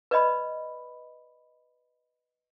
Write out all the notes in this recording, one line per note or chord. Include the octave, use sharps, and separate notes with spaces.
B4 D5 D#5 B5